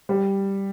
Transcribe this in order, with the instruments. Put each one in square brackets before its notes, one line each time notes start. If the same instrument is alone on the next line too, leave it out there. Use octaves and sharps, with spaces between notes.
[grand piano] G3